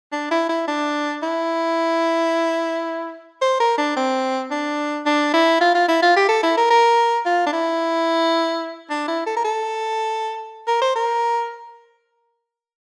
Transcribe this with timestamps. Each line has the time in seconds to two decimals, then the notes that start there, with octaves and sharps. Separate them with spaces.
0.12 D4
0.31 E4
0.49 E4
0.67 D4
1.23 E4
3.42 C5
3.60 A#4
3.78 D4
3.97 C4
4.51 D4
5.06 D4
5.34 E4
5.61 F4
5.75 F4
5.89 E4
6.02 F4
6.16 G4
6.29 A4
6.43 E4
6.57 A#4
6.70 A#4
7.26 F4
7.46 D4
7.53 E4
8.90 D4
9.08 E4
9.26 A4
9.36 A#4
9.45 A4
10.68 A#4
10.81 C5
10.96 A#4